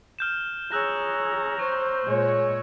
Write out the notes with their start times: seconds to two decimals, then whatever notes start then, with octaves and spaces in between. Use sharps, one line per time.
0.19 F6 G6 E7
0.72 G#4 C#5 A#5 E6 F#6 A#6
1.59 C5 C#6
2.06 A#2 G#3 C#5